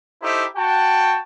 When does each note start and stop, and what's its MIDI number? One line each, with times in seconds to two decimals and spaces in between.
0.23 0.45 63
0.23 0.45 64
0.23 0.45 67
0.23 0.45 69
0.23 0.45 72
0.23 0.45 76
0.57 1.20 66
0.57 1.20 79
0.57 1.20 81